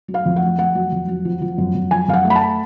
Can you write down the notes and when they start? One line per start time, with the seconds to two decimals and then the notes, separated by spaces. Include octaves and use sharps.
0.08 F#3
0.14 F5
0.26 F2
0.36 F#5
0.42 A3
0.59 F2 F#5
0.75 F#3
0.92 F2
1.08 F#3
1.25 F3
1.41 F3
1.58 F#2
1.75 F#2
1.91 F3 G#5
2.08 F#2 F5
2.13 F#5
2.25 A3
2.30 B5
2.36 A5